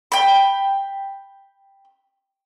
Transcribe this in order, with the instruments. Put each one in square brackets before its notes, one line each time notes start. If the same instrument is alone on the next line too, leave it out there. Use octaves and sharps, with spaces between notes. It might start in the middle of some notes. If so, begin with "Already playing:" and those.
[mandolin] G5 B5